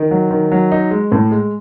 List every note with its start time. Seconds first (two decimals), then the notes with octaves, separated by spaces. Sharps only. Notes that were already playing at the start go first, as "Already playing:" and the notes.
Already playing: D#3
0.11 F#3
0.31 D#3
0.52 F#3
0.72 D#4
0.91 G#3
1.12 A2
1.31 G#3